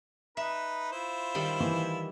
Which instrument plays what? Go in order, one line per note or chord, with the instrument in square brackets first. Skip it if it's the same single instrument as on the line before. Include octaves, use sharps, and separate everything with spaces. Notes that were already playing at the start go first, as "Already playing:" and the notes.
[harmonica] D#4 B4 [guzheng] E5
[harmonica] E4 F4 C5
[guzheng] D#3 G3
[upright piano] E3